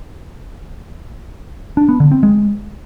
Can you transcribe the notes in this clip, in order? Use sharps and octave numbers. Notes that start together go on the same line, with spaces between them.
D4
B3
D3
C4
G#3